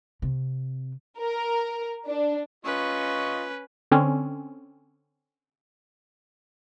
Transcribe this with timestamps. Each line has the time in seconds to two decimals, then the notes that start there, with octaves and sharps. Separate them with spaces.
0.22 C3
1.20 A#4
2.08 D4
2.65 C#4 F4 B4 D#5 C#6
3.91 D3 C4 C#4